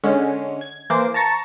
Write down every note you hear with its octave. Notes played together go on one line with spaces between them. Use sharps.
D3 G#3 C#4
G#6
E3 A#3 C5 D6
A5 A#5 C#6 A6 A#6